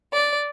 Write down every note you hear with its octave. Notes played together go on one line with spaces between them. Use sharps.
D5